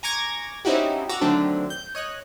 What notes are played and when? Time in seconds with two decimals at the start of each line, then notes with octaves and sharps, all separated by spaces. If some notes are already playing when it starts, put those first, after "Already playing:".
0.03 G#5 A#5 C#6 D6 G#6 A#6
0.65 C4 C#4 D#4 E4 F#4 G4
1.09 F#4 A#5 D6 E6
1.21 D3 D#3 F#3 A3 C4 D4
1.70 G6
1.95 C#5 D#5 F#6